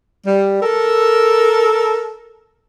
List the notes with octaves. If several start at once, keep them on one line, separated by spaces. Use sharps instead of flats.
G3
A4 A#4